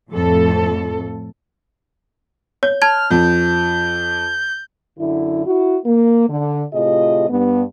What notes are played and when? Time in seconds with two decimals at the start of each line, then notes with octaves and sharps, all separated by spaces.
0.12 F2 A2 A4
2.63 C#5 G6
2.82 A5 F6 G#6
3.11 F2 G6
4.99 F#2 D3 E4
5.46 E4 F#4
5.86 A#3
6.29 D3
6.74 A2 C3 F4 G#4 D#5
7.29 G2 B3